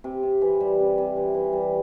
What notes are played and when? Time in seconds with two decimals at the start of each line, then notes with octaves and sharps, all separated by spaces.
0.04 C3
0.23 C3
0.42 E3
0.61 G3
0.79 C3
0.98 C3
1.17 E3
1.34 E3
1.53 G3